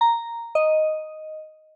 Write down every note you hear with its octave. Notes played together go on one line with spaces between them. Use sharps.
A#5
D#5